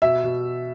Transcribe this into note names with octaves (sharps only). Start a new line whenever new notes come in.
B2 E5
B2